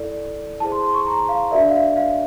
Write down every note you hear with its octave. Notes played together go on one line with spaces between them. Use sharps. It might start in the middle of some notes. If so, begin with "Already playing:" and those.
Already playing: E4 A4 D5
E4 G#4 C5 A5
C6
C6
C#6
A#5
F5
D4 F#4 A#4 D5 E5
F5
E5
F5